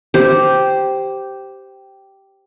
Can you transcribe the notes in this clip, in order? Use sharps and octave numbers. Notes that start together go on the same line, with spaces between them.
G4 C5